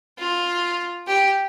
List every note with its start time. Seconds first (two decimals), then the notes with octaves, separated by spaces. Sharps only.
0.19 F4
1.08 G4